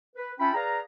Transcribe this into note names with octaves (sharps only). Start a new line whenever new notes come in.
B4
C#4 F4 E5 G5 A5 B5
G#4 B4 D5 F5 A#5